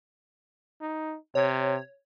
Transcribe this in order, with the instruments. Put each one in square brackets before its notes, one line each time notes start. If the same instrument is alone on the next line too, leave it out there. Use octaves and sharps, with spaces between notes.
[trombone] D#4
[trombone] C3 [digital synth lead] C#5